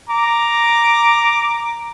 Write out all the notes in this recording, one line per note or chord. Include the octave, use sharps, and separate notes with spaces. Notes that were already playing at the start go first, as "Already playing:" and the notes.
A#5 D6